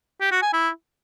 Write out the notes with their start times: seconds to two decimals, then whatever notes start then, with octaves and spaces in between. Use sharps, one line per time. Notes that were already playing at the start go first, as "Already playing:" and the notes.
0.21 G4
0.31 F#4
0.42 G#5
0.53 E4